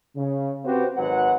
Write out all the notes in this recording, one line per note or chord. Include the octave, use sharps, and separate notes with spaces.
C#3
C4 F#4 G4 B4 C5
G#1 F#3 G#3 B4 F#5